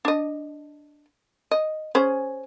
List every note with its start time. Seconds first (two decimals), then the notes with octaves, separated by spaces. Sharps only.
0.05 D4 D#5
1.51 D#5
1.95 C#4 G#4 C5